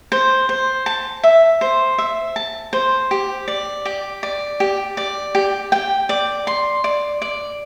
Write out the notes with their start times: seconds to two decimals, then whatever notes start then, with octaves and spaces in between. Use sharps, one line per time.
0.12 C5
0.49 C5
0.86 A5
1.23 E5
1.61 C5
1.98 E5
2.36 A5
2.73 C5
3.11 G4
3.48 D5
3.85 G4
4.23 D5
4.60 G4
4.97 D5
5.35 G4
5.72 G5
6.09 D5
6.47 C6
6.84 D5
7.22 D5